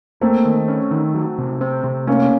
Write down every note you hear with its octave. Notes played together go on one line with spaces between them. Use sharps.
A3 A#3 C4
D#3
C#4
D#3
F#3
C3
C4
C3
A3 A#3 C#4